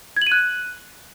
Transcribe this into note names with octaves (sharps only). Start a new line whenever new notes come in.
G#6
F#7
D#7
F#6